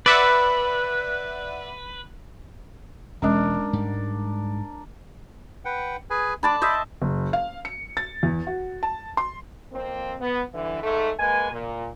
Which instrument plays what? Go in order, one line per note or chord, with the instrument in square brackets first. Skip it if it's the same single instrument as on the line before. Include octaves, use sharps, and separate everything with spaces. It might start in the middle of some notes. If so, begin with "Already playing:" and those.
[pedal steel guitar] B4 [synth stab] D5 E5 F#5
[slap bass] E1 [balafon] G#3 C#4 [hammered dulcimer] D4 A#4
[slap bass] G#2 G3
[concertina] B4 F#5 G5
G#4 B4 G#5
[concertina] D4 [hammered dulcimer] D5 A5 B5
[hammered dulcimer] C5 D#5 E5 [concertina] B5
[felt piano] F#1
F5
C#7
A6
E2
F#4
A5
C6
[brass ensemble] F2 A#3 C4
B3
G2 D3 E3
G#2 A3
G#3 A#3 B4 G#5
A#2